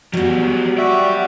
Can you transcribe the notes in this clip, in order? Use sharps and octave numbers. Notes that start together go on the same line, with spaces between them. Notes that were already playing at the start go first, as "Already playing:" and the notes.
F#3 G3 B3 F#4
F#4 G4 D5 E5